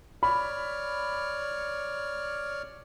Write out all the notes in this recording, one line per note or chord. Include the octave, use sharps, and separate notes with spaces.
C#5 D5 B5 F6